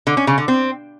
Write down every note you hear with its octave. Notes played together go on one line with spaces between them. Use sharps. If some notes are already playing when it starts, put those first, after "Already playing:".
D3
C#4
C#3
D3
C4